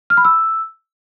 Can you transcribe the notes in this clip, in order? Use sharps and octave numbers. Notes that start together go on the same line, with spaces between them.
F6
B5
E6